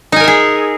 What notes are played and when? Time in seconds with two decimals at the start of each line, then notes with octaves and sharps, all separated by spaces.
0.12 D#4
0.16 G#5
0.20 A#4
0.24 E5
0.28 G#4